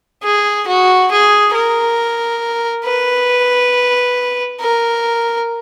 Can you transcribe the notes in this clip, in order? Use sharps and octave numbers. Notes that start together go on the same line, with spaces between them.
G#4
F#4
G#4
A#4
B4
A#4